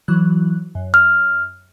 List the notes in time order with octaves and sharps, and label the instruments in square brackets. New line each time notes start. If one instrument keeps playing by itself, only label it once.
[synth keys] E3 F#3 F#6
F#2
[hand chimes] F6